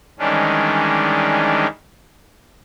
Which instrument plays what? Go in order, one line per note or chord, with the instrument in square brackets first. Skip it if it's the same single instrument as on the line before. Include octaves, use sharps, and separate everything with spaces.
[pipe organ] D#3 E3 G3 G#3 C#4 D4